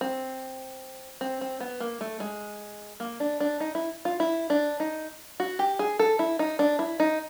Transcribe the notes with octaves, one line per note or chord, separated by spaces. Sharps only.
C4
C4
C4
B3
A#3
A3
G#3
A#3
D4
D4
D#4
E4
F4
E4
D4
D#4
F#4
G4
G#4
A4
E4
D#4
D4
E4
D#4